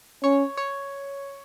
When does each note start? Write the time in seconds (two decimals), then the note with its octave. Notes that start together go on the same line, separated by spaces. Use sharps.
0.23 C#4 C#5
0.57 C#5